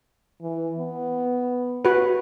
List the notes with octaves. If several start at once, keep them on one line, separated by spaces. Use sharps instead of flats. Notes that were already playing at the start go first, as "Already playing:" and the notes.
E3
B3
F#4 B4